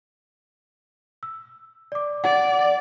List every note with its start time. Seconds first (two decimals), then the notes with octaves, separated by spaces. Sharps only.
1.23 E6
1.92 D5 D6
2.24 D5 F#5